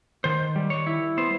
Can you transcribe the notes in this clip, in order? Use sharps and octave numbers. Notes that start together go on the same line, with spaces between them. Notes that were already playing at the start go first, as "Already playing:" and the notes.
D#3 C5
G3
C#5
E4
B3 C5